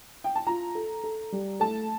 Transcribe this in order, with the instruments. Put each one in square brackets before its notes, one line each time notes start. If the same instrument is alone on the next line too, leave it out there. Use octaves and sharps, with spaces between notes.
[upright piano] G5
A5
[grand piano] F4 [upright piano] A#5
[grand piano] A4
A4
G3
[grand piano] A3 [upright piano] A5